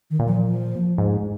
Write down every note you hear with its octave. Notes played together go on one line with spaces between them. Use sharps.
D#3
A#2
F3
F3
G#2